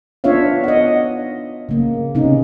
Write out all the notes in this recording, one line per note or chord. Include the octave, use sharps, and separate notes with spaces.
B3 D4 F4 C#5 E5 F5
D#5 F#5
C#3 A#3
C3 B3 C#4 D#4